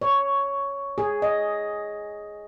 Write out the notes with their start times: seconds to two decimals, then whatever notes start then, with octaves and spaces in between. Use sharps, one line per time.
0.01 C#5
0.98 G#4
1.22 D#5